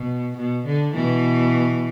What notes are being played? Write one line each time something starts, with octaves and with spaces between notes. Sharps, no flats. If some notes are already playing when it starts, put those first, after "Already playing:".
Already playing: B2
B2
D3
B2 E3